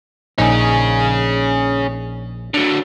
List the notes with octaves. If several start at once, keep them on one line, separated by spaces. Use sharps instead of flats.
A#1 C#4 D#4 G#4
D3 F#3